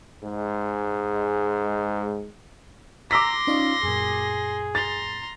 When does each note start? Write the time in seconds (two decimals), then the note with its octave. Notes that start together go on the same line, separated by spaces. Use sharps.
0.22 G#2 G#3
3.11 A#5 C6 D6 E6 A#6 B6
3.47 C#4 D#4 F4 D5
3.83 F#2 A#2 G#4
4.75 A#5 C6 A6